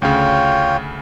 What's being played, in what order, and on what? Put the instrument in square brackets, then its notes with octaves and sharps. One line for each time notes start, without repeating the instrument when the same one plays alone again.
[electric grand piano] D2 C#3 [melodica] F4 C#5 G5